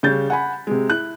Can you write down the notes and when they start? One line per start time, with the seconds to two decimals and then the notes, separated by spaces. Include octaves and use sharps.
0.03 C#3 G3 G6 A6
0.30 F#5 G#5 B5
0.67 C3 G#3
0.89 E4 F#6